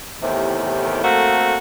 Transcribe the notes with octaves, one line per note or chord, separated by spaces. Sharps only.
E2 A2 C3 D#3 G4
A3 A#3 C4 F#4 A4